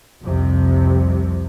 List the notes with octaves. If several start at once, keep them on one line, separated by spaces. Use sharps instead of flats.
C2 F2 C3